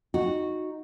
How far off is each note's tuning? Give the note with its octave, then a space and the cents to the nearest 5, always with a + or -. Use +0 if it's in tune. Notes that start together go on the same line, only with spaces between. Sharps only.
D#4 +0 F#4 -10